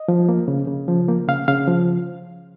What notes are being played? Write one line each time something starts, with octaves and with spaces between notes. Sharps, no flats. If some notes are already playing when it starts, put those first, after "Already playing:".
Already playing: D#5
F3
A#3
C#3
C#3
F3
A#3
C#3 F5
C#3 F5
F3